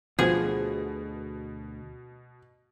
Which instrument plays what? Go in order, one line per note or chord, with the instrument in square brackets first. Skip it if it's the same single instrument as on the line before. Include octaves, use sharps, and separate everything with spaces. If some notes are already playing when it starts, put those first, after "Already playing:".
[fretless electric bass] D2 B3 [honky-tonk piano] B2 [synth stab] F3 [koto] G#4